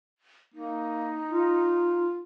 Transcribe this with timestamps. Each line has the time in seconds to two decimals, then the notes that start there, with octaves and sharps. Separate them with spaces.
0.54 A#3 D#4
1.31 F4